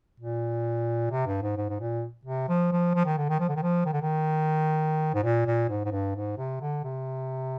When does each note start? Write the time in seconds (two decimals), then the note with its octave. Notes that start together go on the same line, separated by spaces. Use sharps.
0.20 A#2
1.11 C3
1.27 G2
1.42 G#2
1.57 G#2
1.69 G#2
1.80 A#2
2.25 C3
2.49 F3
2.72 F3
2.95 F3
3.05 D#3
3.18 D3
3.29 D#3
3.40 F3
3.49 D3
3.56 D#3
3.63 F3
3.85 D#3
3.93 D3
4.01 D#3
5.14 G#2
5.23 A#2
5.46 A#2
5.69 G#2
5.85 G#2
5.91 G2
6.16 G#2
6.37 C3
6.61 D3
6.84 C3